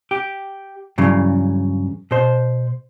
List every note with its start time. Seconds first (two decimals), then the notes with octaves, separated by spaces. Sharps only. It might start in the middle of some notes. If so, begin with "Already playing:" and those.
0.11 G4
0.98 G2 C#3 E3 F#3
2.11 B2 C5